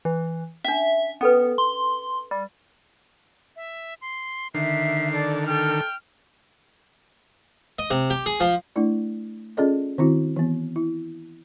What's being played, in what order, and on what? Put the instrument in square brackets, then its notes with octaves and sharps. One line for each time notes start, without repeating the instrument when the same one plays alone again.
[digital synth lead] E3
[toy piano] C#4 D4 [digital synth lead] E5
[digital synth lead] B3 [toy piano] C#4 A4 B4
[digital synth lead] C6
G3
[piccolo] E5
C6
[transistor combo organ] D3 D#3 [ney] E5 [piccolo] C7
[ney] A4 [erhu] D5
[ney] A4 [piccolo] G5 [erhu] F6
[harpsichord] D#5
C3
G4
G#4
F3
[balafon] A3 D4 E4 D5
C#4 F4 G#4 A4 D5 D#5
D#3 C4 E4 F#4
E3 B3
E4